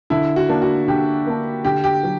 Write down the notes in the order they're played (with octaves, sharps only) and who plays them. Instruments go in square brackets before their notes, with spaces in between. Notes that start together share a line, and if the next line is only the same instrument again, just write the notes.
[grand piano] D3 [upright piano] E4
[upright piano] F#4
[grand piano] A#3 D4
[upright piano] F#4
[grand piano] D3 [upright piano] G4
[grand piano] A#3 D4
[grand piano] D3 [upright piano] G4
[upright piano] G4
[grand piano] F#3